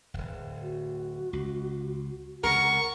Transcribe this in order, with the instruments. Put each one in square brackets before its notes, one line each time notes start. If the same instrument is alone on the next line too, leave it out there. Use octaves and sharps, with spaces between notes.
[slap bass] D1 G1
[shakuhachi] F#4
[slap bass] C#2
[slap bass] C#2 C3 [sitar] A#4 [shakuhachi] F#5 [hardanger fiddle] C#6